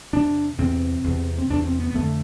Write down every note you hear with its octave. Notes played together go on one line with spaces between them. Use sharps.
E2 C3 D4
E2 C3 C4
E2 C3
C4
E2 C3 D4
C4
B3
B3
F2 D3 A3